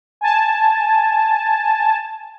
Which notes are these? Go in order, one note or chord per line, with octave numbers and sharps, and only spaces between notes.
G#5 A5